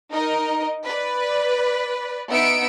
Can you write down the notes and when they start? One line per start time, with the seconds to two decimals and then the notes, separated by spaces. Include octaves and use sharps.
0.11 D#4 A#4 D#5
0.85 B4 D5
2.31 B3 D#4 E5 E6 C#7 D7